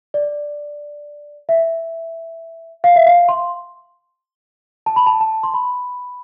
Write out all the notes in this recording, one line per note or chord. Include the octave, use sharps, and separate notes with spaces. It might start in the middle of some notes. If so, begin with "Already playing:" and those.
D5
E5
F5
E5
F5
C6
A5
B5
A5
A5
C6
B5